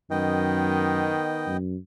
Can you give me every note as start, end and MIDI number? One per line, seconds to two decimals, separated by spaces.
0.11 1.17 42
0.11 1.53 51
0.11 1.57 59
0.11 1.57 75
0.11 1.57 79
1.47 1.76 42